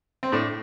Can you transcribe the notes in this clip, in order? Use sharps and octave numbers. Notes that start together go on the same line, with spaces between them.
C4
A2 D4